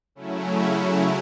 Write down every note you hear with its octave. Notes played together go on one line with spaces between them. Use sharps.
C#3 F#3 A3 C#4 E4